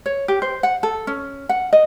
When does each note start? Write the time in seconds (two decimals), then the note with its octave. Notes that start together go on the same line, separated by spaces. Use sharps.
0.06 C#5
0.28 G4
0.42 C5
0.63 F#5
0.83 A4
1.07 C#4
1.49 F#5
1.73 D#5